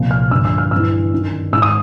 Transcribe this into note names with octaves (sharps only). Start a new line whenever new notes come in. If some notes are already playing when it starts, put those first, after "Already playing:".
Already playing: C2 A#2 F3
F6
G2 D3 F3 E6
E6
F6
G2 E3 E6
F#2 D#3
G#2 D#3 E6
D#6